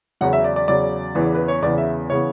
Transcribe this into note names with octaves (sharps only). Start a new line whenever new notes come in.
E2 C#3 F#3 F#5
E5
D5
D5
E2 C#3 F#3 D5
E2 C#3 E3 B3
B4
C#5
E2 C#3 E3 B3 D5
E5
C#3 E3 B3 C#5